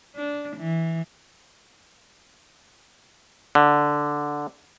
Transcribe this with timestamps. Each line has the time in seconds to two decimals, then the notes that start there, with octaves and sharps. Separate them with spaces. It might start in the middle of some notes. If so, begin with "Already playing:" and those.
0.16 D4
0.57 E3
3.55 D3